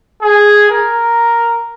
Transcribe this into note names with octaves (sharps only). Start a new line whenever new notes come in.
G#4
A#4